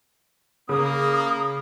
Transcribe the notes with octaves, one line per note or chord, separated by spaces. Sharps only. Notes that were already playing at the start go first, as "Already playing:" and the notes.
C#3 A#3 D#6